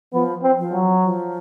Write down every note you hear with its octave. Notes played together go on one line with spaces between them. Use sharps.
F3 B3
C4
F3
F#3
F3